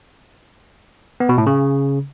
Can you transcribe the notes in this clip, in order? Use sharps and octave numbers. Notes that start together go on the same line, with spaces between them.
B3
B2
A2
C#3